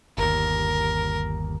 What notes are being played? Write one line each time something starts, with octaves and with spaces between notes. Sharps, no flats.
G1 D#2 A#4